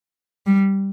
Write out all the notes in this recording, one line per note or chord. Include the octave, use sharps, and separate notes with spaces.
G3